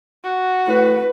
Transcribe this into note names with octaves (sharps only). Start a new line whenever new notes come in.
F#4
A2 B4